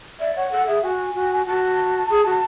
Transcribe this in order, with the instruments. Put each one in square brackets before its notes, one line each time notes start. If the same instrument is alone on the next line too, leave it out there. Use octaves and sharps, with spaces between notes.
[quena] D5 [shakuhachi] E5
[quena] C#5 [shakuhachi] F#5
[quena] A4 [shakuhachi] F#5
[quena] G#4 [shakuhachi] E5
[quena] F#4 [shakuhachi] G#5
[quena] F#4
[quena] F#4 [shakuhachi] A5
[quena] G#4
F#4